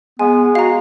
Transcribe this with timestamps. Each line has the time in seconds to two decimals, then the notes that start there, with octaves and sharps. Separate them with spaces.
0.19 G#3 B3 G#5
0.55 F#4 F5 A#5